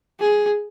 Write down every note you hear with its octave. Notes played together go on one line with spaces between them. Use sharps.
G#4